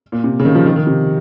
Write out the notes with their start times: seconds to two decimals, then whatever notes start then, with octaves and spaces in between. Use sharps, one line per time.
0.12 A#2
0.24 C3
0.40 C#3
0.45 D#3
0.55 F3
0.66 D#3
0.76 D#3
0.87 C3